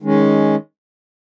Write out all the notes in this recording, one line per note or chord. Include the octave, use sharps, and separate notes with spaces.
D#3 G#3 C#4